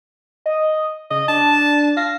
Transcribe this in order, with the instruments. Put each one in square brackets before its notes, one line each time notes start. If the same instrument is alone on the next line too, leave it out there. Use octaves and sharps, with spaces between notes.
[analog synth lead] D#5
[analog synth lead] C#3 [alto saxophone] D#5
[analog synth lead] D4 [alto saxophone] A5
[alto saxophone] F5 [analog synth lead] A#6